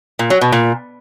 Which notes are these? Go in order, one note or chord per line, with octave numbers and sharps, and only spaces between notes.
A#2
F#3
B2
A#2